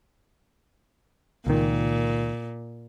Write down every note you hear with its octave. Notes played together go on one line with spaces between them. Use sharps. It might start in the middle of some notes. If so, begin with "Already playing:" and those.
C#2 A#2 D#3